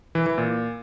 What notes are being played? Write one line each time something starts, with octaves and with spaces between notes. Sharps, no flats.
E3
E3
A#2